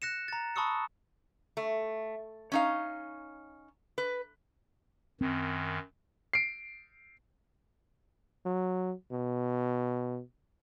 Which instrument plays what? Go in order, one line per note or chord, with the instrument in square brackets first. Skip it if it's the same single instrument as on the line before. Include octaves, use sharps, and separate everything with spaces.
[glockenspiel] F#6 A#6 C#7 E7
A#5 A6
A5 B5 C#6 D#6 E6 C#7
[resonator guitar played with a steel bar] A3
C#4 D#4 F5
B4
[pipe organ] F#2 D#3 [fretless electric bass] C4
[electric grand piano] C7 D7
[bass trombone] F#3
B2